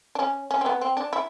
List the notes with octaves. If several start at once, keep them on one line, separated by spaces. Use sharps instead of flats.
D4
C#4
C#4
C4
B3
C4
D4
E4